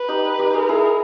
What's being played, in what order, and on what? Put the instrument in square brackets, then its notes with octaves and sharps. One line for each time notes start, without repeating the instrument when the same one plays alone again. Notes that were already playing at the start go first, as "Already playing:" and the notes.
Already playing: [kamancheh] B4
[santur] D#4 G4
D#4 G4
[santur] G#4 [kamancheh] A#4
[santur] E4 G#4